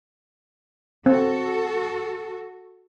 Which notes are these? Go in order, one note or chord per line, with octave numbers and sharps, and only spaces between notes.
C4 F#4 A4